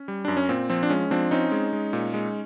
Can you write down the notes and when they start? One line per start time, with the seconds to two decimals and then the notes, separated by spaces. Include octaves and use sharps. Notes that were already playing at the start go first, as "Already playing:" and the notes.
Already playing: C#4
0.08 G3
0.25 F#2 D4
0.37 C#4
0.49 A#2 C4
0.70 F3 C4
0.83 D4
0.90 G#3 C#4
1.11 F3 C4 D4
1.31 C4 C#4 D#4
1.52 G#3
1.73 G#3
1.93 A#2
2.14 G#3